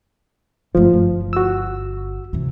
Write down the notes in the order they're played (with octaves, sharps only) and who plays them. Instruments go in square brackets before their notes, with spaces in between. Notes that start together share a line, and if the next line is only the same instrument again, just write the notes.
[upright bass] G1 A3 [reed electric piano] F3
[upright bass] G1
[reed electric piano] F#4 E6
[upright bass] C3 E3